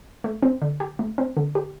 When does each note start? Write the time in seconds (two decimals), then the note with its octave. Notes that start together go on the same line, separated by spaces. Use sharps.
0.24 A3
0.42 C4
0.62 D3
0.80 G4
0.99 A3
1.18 C4
1.37 D3
1.55 G4